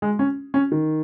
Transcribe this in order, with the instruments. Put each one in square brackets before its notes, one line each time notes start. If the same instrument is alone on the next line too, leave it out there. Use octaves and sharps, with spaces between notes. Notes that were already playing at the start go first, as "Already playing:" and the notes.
[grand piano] G#3
C#4
C#4
D#3